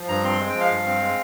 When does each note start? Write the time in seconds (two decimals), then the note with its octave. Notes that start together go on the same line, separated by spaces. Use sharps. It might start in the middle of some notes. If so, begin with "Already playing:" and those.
Already playing: F3
0.08 G2 A#5
0.24 C4 C6
0.40 G#3
0.49 G5
0.55 F3
0.60 F5
0.71 G2
0.86 C4
1.02 G#3